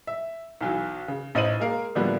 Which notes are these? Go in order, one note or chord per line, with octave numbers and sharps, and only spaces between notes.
E5
B1 E3 F#3
C#3
A1 D#4 C5 D#7 F#7
G#3 A#3 A#4 F5
A2 D3 F3 G3 A#3 B3